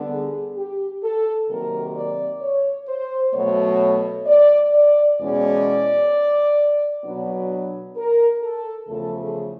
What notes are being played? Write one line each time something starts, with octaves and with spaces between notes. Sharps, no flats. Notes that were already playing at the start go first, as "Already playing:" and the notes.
Already playing: D3 G3 B3 D4
G#4
G4
A4
C3 D#3 F#3 A#3 A#4
D5
C#5
C5
B2 F#3 A3 C#5
D5
D5
E2 B2 G#3 C#4 D5
B2 F#3 B3 D4
A#4
A4
E2 C#3 F3 A3 A4
G#4